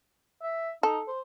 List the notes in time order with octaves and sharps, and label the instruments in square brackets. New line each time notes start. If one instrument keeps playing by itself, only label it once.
[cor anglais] E5
[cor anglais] D#4 [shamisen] A4
[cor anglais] C5